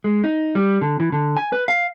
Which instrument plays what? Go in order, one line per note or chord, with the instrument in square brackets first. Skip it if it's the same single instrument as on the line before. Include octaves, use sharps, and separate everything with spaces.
[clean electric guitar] G#3
D#4
G3
D3
E3
D3
G#5
B4
F5